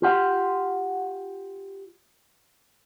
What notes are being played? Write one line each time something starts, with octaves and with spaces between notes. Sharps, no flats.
F4 G4 F#5